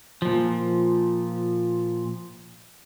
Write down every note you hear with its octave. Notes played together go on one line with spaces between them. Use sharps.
A#2 F3